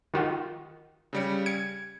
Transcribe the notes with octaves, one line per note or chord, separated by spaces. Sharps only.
D#3 F4 F#4
C#3 G3 C#7
G#6 C#7